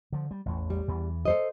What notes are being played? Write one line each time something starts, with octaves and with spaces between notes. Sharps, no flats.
D3 F3
G3
A1 E2
G3
E2 E3 B3
A4 C5 D#5